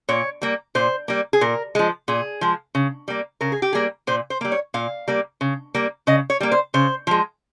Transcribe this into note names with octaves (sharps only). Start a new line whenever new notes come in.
A#2 C#5
G3 A#3
A#2 C5
G3 A#3
G#4
A#2 A#4
F3 G#3
A#2 G#4
F3 G#3
C#3
G3 A#3
C#3 A#4
G#4
G4
G3 A#3 G#4
A#2 C5
C5
G3 A#3
C#5
A#2 F5
G3 A#3
C#3
G3 A#3
C#3 D#5
C#5
G3 A#3
C5
C#3 C5
F3 G#3